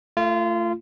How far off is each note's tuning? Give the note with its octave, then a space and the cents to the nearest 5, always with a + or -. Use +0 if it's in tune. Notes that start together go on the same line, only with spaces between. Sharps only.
A3 +20 F4 -25